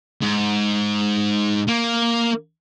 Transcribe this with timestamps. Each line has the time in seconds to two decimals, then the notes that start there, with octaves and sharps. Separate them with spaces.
0.22 G#2
1.68 A#3